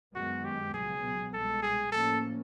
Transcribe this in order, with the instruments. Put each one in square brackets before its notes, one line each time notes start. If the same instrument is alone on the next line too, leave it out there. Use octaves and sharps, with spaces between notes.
[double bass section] F#2 D#3 G#3 B3 [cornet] F#4
[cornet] G4
[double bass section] C#2 B2 F#3 B3 [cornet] G#4
[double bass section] C2 B2 G#3 [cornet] A4
[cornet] G#4
[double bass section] A2 F3 A#3 C#4 [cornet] A4